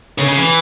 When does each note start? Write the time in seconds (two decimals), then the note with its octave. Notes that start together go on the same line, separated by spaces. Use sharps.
0.18 C#3
0.28 C#3
0.37 E3